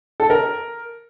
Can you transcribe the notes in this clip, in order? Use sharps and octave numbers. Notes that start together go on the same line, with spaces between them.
A4
A#4